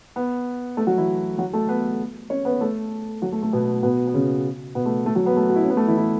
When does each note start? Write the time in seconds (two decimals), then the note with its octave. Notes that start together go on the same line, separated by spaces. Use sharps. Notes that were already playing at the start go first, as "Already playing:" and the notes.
0.16 B3 B4
0.77 A3 A4
0.87 F#3 F#4
0.97 E3 E4
1.38 F#3 F#4
1.53 A3 A4
1.69 B3 B4
2.30 C#4 C#5
2.45 B3 B4
2.61 A3 A4
3.22 F#3 F#4
3.32 A3
3.42 A3
3.53 B2 B3
3.83 B2 B3
4.07 B3
4.14 C#3 C#4
4.75 B2 B3
4.86 A3
5.06 A3
5.15 F#3 F#4
5.26 B3 B4
5.36 A3
5.49 F#4
5.56 E4
5.63 C#4
5.70 B3
5.77 A3
5.87 E3 E4
5.97 E3 E4